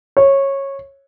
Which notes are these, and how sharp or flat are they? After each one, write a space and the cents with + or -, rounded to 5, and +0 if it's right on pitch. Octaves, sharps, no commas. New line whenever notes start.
C#5 -15